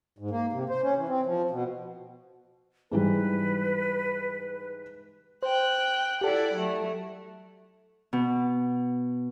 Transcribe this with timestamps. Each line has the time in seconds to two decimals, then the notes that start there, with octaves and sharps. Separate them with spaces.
0.18 G#2
0.30 A#3
0.53 C3
0.69 C5
0.83 C#4
0.96 E3
1.08 C4
1.26 F3
1.51 B2
2.92 G#2 E3 G3 B4
5.43 C5 G5 F#6
6.21 E4 G4 A4 D5 F#5
6.56 F#3 A3
8.13 B2